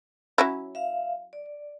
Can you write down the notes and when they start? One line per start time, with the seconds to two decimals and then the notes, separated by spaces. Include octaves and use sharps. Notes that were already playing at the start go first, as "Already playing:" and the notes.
0.38 F#3 C#4 E4
0.75 E5 F5
1.33 D5